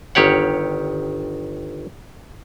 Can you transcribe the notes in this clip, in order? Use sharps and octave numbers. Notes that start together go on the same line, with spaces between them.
G1 D#3 G4 C#5 F#5